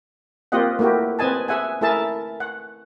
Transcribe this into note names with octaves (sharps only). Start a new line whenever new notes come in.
A#3 C4 F4 G4 D#5 F#5
A3 A#3 E4 F#4 G4
C4 B4 D#5 G#5 A5
G#4 E5 F#5 G#5
A3 E4 G#4 A#4 E5 A5
F#5